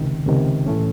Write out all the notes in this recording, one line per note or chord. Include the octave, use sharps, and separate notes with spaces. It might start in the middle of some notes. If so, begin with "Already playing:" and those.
Already playing: C#2 C3 D#3
C#2 C3 D#3
A2 E3 A3 C#4